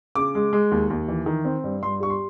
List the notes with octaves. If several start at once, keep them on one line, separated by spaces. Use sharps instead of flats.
C#3 D6
G#3
G#3
D#2
D#2
E3
D#3
C4
G2
G2 C6
G3 C#6
C6